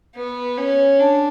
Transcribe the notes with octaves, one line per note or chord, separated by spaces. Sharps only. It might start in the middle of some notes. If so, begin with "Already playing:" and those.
B3
C#4
D4